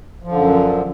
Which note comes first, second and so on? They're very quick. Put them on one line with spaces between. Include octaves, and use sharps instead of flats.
F3 D3 F#2